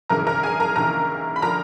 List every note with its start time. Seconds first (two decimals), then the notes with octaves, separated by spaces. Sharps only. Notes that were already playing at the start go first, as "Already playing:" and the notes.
0.09 G#1 F#2 C#3 E3 A#4 A#5
0.27 A#4 A#5
0.43 G#4 G#5
0.60 A#4 A#5
0.76 D#2 C#3 E3 A#4 A#5
1.36 B5
1.42 D3 F3 A#4 A#5